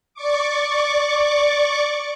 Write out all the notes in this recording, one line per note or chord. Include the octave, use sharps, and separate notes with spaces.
D5 C#6 D6